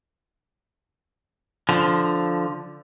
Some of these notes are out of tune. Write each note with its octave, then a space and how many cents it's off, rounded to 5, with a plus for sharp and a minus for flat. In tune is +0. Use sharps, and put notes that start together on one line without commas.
D3 +0 F3 +0